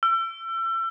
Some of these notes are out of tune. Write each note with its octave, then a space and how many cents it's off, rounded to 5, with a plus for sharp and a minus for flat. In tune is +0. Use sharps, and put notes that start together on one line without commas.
E6 +35